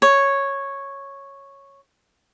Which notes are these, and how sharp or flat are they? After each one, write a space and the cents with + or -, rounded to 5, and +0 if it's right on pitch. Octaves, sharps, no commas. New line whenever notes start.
C#5 -5